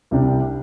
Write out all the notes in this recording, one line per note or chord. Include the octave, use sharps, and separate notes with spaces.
C2 C3 G3 D4 G4